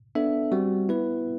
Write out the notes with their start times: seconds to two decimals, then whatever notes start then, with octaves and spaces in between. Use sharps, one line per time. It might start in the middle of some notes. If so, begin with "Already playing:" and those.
0.15 B3 D4 A4 E5
0.52 G3 C4 F#4
0.89 B3 E4 B4